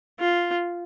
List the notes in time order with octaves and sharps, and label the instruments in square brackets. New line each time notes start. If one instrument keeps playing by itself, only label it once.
[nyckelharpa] F4